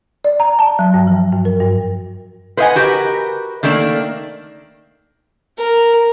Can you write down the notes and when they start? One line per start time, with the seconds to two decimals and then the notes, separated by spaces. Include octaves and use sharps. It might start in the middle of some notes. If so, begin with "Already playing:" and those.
0.24 D5
0.40 A#5
0.59 A5
0.79 F#3
0.94 G2
1.07 F3
1.32 G2
1.45 A#4
1.60 G2
2.57 B4 C5 D#5 F5 F#5 G#5
2.76 F#4 G4 A#4 B4
3.63 D#3 A3 A#3 D4
5.58 A#4